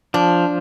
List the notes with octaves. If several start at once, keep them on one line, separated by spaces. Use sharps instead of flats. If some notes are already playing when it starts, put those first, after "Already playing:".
F3 D4